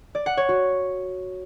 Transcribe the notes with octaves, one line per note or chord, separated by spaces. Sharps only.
D5
F#5
C#5
F#4